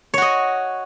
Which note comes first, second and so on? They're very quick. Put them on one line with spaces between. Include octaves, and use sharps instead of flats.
C#5 F#4 D#5